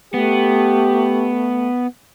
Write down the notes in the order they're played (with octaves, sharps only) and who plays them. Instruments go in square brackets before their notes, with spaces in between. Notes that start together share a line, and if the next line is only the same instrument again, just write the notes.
[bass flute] A3 [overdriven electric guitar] B3 [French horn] G4